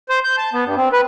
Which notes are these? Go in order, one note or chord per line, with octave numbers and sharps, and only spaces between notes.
C5
G6
A5
B3
G2
C4
B4